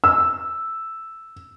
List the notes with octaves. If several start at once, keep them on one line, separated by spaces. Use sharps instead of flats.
E6